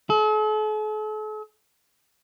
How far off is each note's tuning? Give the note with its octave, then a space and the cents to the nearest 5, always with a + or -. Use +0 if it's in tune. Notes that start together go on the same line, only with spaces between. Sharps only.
A4 -45